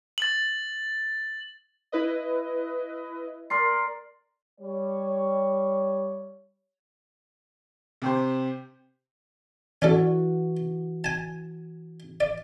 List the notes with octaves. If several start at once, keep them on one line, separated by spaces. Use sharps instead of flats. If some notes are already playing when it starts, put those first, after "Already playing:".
A6 F#7
E4 B4 D#5
A#4 D5 C6
G3 C#5
C3 G4 C5
E3 C#4 D4 F#4 A4
G#5 A5
D5